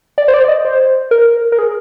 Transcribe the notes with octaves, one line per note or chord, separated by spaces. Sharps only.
D5
C5
D5
D5
D#5
C5
A#4
A#4
G#4